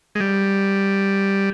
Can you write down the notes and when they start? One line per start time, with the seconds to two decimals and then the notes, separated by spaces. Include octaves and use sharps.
0.15 G#3
0.20 G3